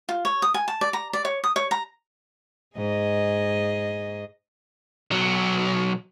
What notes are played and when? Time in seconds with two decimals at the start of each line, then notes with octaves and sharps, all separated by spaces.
0.09 F4
0.25 C#5
0.42 D#6
0.54 G#5
0.68 A5
0.81 D5
0.93 A#5
1.13 D5
1.25 C#5
1.44 D#6
1.56 C#5
1.71 A#5
2.77 G#2 G#4 D#5
5.12 B1 F#3